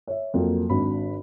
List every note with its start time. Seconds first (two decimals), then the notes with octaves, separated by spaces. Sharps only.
0.07 C#5 E5
0.34 F2 F#3 A#3
0.69 G#1 D4 F#4 B5